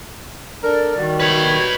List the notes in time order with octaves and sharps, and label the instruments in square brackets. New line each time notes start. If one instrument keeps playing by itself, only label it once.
[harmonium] D4 A4 [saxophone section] A#4 [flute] D5
[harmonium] D#3 [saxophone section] G3 F#4
[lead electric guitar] B4 C#5 [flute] G#6